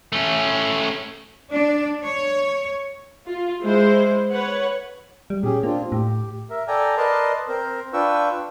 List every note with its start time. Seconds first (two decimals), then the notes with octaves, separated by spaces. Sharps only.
0.12 A3 C#4
1.52 D4
2.05 C#5
3.28 F4
3.61 G#3 E4 C5
4.31 B4 C#5 F#5
5.30 G3
5.43 A#2 C#4 G4 G#4
5.63 A#3 C4 D4 F4
5.92 A2 G4
6.50 A#4 E5
6.68 A4 D5 G5 G#5 A#5
6.97 A#4 B4 D5 D#5 A5 C6
7.48 C4 A#4 C5
7.93 D4 F4 B4 G5 C#6 E6